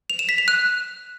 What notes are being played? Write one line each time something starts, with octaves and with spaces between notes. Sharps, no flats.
F7
E7
B6
F7
F#6